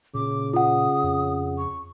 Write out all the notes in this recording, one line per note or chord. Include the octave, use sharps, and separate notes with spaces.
A#2 C#3 D6
F4 F#5 D#6
F2
C#6